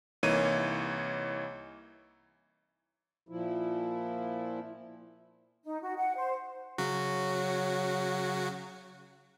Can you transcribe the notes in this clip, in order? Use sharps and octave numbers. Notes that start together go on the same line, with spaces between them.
C2 E3 A#3 D#4 C#5 D#7
A#2 F3 E4
D#4
F#4
F#5
C5
C#3 F#3 F#4